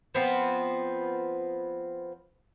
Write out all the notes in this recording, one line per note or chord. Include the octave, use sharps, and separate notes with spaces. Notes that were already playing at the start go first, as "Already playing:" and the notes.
F3 B3 C4